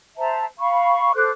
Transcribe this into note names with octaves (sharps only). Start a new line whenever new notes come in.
C5 E5 A5 A#5
F5 B5 C#6
A4 C5 D6 F#6